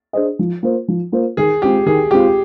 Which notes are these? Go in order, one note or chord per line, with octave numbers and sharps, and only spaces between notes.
D4 G#4 C5 D#5
F3
A#3 F4 C5
F3
A#3 F4 C5
D#3 G#4
G#3 C4 F4 G4
D#3 G#4
G#3 C4 F4 G4